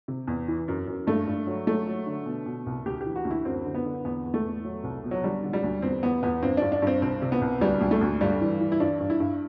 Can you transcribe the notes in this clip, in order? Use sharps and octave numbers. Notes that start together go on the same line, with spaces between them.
C3
E2
E3
F#2
F#2
G2 A3
G2
F#3
F#3 A3
F#3
D3
B2
B2
C2
D2 G4
E3 G4
F#4
D2
E4
F#2 C4
D3
B3
D3
E2 B3
E2
A3
E2
F#3
C2
B2
F#3
D3 G3
D3
G3
D2
E2 C4
E2 B3
E2 B3
G2 C4
G2 D4
D4
G2 C4
C2 C4
C3
B3
C2
D2 G3
D2
A3
D2
G2 G3
E3
E3
E4
G2 D4
G2
E4
G2